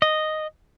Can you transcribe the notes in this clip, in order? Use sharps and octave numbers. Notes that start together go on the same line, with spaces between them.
D#5